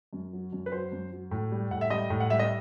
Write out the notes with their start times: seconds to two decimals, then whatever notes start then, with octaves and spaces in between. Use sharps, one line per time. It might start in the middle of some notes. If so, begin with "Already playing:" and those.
0.13 F#2
0.33 F#3
0.52 F#2
0.66 B4
0.72 F#3 C5
0.92 F#2
1.12 F#3
1.31 A2
1.51 G3
1.71 A2 F#5
1.81 E5
1.90 G3 D#5
2.10 A2
2.20 F#5
2.30 G3 E5
2.39 D#5